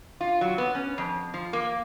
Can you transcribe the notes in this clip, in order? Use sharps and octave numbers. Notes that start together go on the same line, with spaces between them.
F4
F#3
B3
C#4
F2
F3
A#3